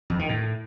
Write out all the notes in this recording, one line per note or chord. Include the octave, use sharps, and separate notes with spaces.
F2
D#3
A2